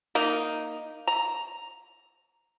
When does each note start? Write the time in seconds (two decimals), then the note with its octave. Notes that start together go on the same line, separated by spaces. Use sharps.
0.15 A#3 D#4
1.07 A#5